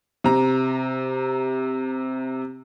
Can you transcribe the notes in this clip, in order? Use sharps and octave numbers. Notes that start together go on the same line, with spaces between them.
C3 A#5